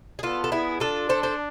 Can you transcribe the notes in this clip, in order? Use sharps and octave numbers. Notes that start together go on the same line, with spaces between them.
G#4
B3 F4 A4
A4
E4 G#4
D4 F4 A4
A4 C5
A4 C5